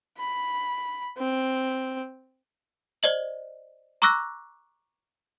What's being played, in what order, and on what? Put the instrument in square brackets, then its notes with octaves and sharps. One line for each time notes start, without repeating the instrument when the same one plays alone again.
[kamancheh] B5
C4
[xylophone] C5 D5 D#5 F#7
A#5 C#6 D6 E6 F#6 A#6